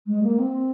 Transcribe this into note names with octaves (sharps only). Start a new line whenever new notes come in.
G#3
A#3
C4